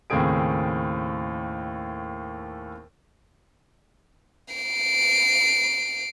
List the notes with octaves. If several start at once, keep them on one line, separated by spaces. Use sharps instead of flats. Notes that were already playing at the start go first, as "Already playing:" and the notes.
D#2 A2 C#3 C4 G#4 D7
C7 D7